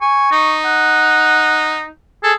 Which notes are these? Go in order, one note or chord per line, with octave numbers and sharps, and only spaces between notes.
G#5 C#6
D#4
F#5
G#4 A4